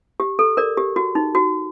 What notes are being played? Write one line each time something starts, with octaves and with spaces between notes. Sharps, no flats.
G4
A4
A#4 D5
G4
F#4
D#4
F#4